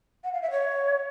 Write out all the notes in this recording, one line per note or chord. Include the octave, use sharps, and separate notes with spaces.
F#5
F5
E5
C#5